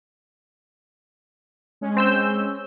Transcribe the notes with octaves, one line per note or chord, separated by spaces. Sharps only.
G#3 C#4
C4 E6 G6